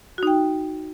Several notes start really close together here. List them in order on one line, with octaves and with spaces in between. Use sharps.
F#4 D#4 G5